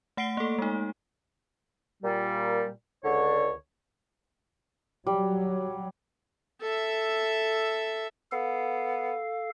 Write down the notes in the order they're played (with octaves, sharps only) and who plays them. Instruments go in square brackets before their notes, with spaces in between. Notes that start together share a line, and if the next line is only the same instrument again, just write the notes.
[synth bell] A3 F#5 C7 D7 G7
A#3 A4
G#3 D#4
[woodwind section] A#2 G3
C#2 D3 C#5
[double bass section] F#3 [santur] G3
[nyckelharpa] A4 E5
[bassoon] B3 [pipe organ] A4 F5